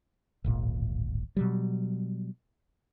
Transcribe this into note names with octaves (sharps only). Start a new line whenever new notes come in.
D1 G#1 A#2
B2 F#3 G3